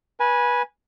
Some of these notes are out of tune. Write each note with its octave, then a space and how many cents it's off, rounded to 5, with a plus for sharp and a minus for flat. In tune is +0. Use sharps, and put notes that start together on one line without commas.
B4 -25 G#5 +0